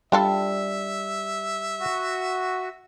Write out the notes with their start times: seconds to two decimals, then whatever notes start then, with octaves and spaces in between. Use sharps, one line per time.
0.12 G3 D4 F4 A4 E5
1.80 F#4